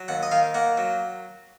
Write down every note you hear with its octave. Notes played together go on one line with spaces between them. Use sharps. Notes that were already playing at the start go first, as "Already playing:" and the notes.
Already playing: F#3
D#2 F#5
D#5
D#3 F5
A#3 F#5
F#3